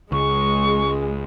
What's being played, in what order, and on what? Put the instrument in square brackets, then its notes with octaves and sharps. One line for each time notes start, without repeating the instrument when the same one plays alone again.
[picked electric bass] C#2 [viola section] G#3 [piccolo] C#6